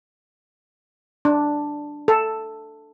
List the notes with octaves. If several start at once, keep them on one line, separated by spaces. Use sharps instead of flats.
D4
A4